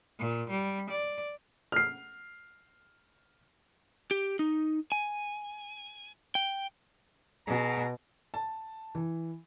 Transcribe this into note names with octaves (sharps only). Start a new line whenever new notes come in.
A#2
G3
D5
F6 C7
G4
D#4
G#5
G5
B2 F#4 G#4 A#5
A5
E3